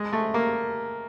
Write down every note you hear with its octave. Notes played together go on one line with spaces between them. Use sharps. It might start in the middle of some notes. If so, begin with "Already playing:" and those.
Already playing: G#3
A3
A#3